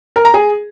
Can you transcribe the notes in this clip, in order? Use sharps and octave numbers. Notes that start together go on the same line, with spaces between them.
A#4
A#5
G#4